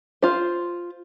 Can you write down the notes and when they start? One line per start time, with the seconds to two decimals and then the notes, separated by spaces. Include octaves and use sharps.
0.22 F4 C5